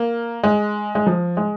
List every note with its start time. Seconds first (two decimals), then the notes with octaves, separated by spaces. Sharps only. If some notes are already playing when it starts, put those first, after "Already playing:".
Already playing: A#3
0.44 G#3
0.95 G#3
1.07 F3
1.37 G#3